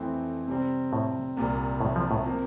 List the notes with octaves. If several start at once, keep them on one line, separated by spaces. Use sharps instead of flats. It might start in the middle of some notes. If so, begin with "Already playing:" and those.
Already playing: F2 E3 A3 C4 E4
C3 G3 C4
A2
C2 A#2 G3
A2
F3
A2
C3 F3 A#3